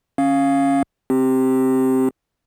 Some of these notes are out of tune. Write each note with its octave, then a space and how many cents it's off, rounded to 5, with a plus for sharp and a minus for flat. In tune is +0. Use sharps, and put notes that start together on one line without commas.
C#4 -10 F5 +0
C4 +0 G4 +0